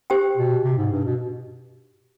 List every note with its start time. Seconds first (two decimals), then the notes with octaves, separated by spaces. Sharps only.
0.10 G4 C5 G5
0.37 B2
0.64 C3
0.78 G#2
0.92 G2
1.05 B2